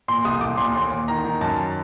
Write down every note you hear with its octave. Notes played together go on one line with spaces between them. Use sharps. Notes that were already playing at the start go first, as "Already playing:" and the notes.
A#2 C6
C2 D#6
C2 D6
A#2 C6
D#2 C6
D#2
D#3 A#5
D#3
F#2 A5